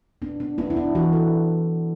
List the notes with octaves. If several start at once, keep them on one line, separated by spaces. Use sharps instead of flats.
B3 D4
D4
B3 E4
D4
E4
E3 F#4
A4